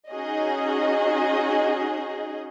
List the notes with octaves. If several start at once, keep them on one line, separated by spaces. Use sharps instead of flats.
C#4 D#4 F#4 G#4 D#5